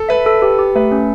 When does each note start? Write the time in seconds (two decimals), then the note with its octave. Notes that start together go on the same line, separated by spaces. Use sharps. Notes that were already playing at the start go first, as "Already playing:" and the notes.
Already playing: A4
0.09 B4 E5
0.26 A4
0.42 G4 B4
0.59 G4
0.76 A3 B4
0.92 C#4